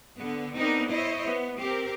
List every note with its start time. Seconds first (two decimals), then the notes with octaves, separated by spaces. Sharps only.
0.17 D3 B3
0.56 B3 C4 D4 D#4 A#4
0.89 E4 C5 C#5 D#5
1.27 B3
1.59 C4 G4 A#4